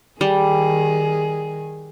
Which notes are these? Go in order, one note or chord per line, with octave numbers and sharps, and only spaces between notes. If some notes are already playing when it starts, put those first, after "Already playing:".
D#3 G3 G#4